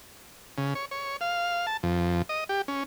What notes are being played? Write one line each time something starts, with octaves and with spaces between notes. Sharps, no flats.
C#3
C#5
C#5
F5
A5
F2
D#5
G4
C#4